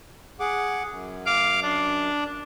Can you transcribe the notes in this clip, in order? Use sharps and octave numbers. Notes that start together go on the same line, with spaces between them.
G#4 F#5 D6
F#2
F5 D6
D4